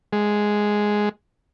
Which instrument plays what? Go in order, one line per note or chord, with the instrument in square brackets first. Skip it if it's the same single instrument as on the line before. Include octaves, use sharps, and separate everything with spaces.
[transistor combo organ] G#3